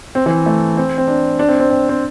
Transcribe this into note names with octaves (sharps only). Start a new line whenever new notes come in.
C4
E3
A3
C4
C4
D4
D4
C4
C4
C4
C4